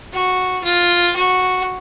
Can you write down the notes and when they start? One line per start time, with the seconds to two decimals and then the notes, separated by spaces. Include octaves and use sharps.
0.13 F#4
0.64 F4
1.15 F#4